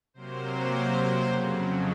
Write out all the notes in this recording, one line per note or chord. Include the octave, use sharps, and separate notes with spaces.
C3 F#3 A#3 C5
F2 C#3 F#3